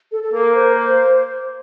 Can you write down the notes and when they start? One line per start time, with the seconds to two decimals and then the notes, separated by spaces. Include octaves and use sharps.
0.12 A4
0.23 A4
0.33 A#3 A#4
0.54 C5